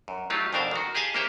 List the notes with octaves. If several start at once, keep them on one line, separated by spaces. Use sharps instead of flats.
F#2
F#3 A3 D#4 F4 G4
F2 B2 D4 A#4 C5 F5
D#3 F#4
G4 G#4 D#5 F5 G#5 A5
A#3 C#4 G4 A#4 C5 E5